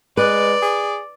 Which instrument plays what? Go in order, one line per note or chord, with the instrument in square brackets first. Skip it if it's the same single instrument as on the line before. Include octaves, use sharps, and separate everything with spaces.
[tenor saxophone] G#3 [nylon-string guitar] B4 [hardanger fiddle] D5
[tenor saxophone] G#4